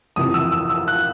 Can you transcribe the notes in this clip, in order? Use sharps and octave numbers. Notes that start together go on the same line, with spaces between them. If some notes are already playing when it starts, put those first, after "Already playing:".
F2 C3 E3 D#6
E6
E6
E6
F#6